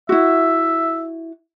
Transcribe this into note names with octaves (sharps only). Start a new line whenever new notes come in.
E4 F#4 E5